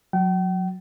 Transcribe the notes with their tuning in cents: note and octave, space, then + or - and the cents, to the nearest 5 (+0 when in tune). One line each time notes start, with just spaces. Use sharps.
F#3 -25 G5 -45